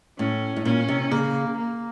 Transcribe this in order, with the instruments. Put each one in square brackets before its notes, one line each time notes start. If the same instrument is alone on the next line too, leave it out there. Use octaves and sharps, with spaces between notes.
[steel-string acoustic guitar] A2 [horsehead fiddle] C#4
[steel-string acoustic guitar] A2
[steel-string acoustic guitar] A#2 [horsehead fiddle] C#4
[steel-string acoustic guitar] C3
[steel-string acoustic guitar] C#3 [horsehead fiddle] A#3
[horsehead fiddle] A#3